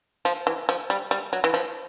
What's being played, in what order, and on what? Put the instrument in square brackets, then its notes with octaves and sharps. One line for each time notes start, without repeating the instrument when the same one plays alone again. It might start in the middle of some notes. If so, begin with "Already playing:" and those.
[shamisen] F3
E3
F3
G3
G3
F#3
E3
F3